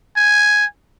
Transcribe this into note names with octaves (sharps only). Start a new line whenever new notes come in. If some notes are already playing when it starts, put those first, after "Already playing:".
G#5